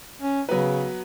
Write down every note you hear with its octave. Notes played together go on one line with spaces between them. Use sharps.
C#4
C#3 F#3 B3 B4